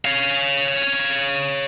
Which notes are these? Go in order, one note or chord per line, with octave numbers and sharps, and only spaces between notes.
C#5 F5